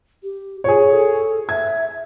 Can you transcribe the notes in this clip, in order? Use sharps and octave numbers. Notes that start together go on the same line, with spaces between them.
G4
F4 G#4 C#5
A4
E5 G#6